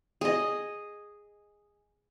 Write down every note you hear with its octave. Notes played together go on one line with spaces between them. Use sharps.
G#4 D#5